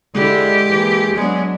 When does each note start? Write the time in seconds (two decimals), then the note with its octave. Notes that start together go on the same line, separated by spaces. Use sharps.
0.15 D3 G#3 E4 G4
0.67 E3 A#3
1.15 F#3 G#3 B3 D4